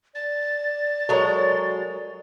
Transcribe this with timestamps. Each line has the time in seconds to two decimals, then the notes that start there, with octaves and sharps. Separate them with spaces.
0.15 D5 A6
1.09 F#3 G#3 A4 A#4 C#5 A#5